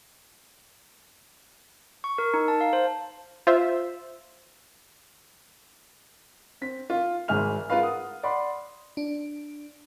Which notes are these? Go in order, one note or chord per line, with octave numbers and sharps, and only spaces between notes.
C#6
A#4
D#4
A5
F5
C5
F4 C5 E5
C4 B6
F4
G#1 G#2 G#4 E5 F6 F7
G#3 F4 A#4 B4 F5
F#5 D#6
D5 F#5 B5 C6
D4